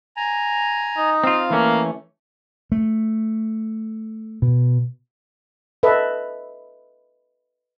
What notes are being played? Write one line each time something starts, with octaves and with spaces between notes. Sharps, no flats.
G#5 A#5
D#4
C4 F4 F5
E3 A3 A#3 C#4
A3
B2
A4 B4 D#5 E5